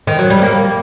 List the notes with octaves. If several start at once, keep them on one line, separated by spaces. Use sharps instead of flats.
D#3
F#3
G3
A#3